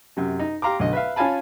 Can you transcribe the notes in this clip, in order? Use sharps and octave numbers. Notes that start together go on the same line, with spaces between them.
F#2 C3
D#4
G4 F5 A#5 C6 D6
B1 D3 D#5
B4 E5 F5
C#4 F4 F5 G#5 A5 B5